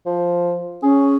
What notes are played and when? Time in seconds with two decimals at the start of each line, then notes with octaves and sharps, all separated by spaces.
0.06 F3
0.83 C#4 G#4